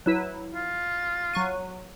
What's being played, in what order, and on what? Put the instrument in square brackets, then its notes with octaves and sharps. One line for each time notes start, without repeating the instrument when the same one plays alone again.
[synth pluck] F#3 E4 B4
[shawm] F4
[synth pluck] F#3 C#6 D#7